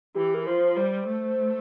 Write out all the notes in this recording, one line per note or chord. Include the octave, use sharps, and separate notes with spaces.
E3 G4
A#4
F3 C5
G3 C5
A3